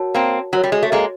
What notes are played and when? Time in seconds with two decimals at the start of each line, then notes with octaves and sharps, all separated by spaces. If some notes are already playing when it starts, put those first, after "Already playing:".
Already playing: F#4 A#4 C#5 F#5 A5
0.15 A#3 C4
0.53 F#3 F#4 A#4 C#5
0.64 G3
0.72 G#3
0.83 A3
0.92 G#3 A#3